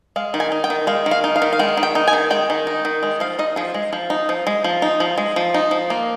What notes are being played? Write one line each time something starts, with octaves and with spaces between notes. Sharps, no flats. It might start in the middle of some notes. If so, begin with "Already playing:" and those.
G#3 F5
D#3
G#5
D#4
G5
D#3
G#3 F5
D#3
F5
D#4
F5
D#3
F5
G#3 G5
D#3
G5
D#4
G#5
D#3
G#3 G5
D#3
D#4
D#3
G#3
F3 F5
D#4 D#5
F3 G#4
G#3
F3
D#4
F3
G#3
F3
D#4
F3
G#3
F3
D#4
F3
A#3